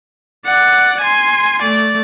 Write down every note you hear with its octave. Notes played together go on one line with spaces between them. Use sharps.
D5 F#5
G#5 C6
A3 D5